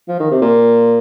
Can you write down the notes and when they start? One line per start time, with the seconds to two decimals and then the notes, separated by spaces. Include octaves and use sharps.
0.08 F3
0.20 D#3
0.31 C3
0.42 A#2